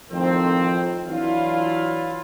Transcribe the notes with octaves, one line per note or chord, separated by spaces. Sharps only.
F2 A2 D#3 C4
E3 F#3 D4 E4 F4